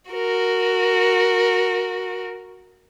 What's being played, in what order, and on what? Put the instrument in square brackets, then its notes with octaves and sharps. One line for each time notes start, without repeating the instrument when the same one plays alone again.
[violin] F#4 A#4